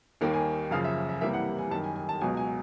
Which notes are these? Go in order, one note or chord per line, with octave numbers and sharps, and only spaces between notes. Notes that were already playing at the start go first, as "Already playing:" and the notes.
D#2 D#3 G3 A#3
G#5
F#2 C#3 F3 F5
E5
E5
C2 C3 E3 G3 A#3 E5
F#5
G#5
F#2 D#3 G3 A5
G#5
G#5
A5
C#2 B2 F#3 G#5
G#5